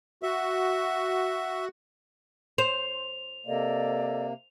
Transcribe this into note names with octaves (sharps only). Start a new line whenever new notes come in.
F#4 E5
C5 F7
C3 A#3 A4 D5 D#5